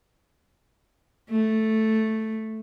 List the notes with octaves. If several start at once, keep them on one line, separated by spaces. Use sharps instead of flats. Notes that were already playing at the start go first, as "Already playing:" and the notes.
A3